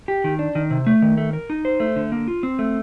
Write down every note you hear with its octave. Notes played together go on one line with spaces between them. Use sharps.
G4
D#3
D4
D#3
C3
A3
D#3
A3
A#4
D#4
C5
A3
D3
A#3
F4
C4
A3